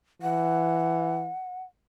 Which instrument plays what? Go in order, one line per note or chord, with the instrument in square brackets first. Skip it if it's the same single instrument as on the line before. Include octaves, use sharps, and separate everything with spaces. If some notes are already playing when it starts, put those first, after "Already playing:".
[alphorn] E3 [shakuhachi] F#5